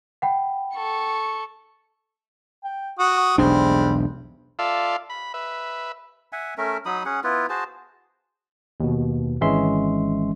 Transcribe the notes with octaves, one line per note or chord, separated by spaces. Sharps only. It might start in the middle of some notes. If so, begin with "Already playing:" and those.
F#5 G5 B5
A4 C#6
G5
F#4 D#6
E1 B1 G3 G#3 C4 D4
F4 A4 D5 E5 F5
B5
B4 E5
E5 F#5 G#5
A3 C#4 A#4 E5
F#3 D#4 B5 D#6
C#4 G#4 F#5
B3 E4 F4 B4
F#4 G#4 C5 A5
D#2 B2
G#1 E3 G#3 C#4 E5 C6